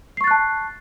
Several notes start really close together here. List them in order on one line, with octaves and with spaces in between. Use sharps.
C7 C#6 A6 F#6 A5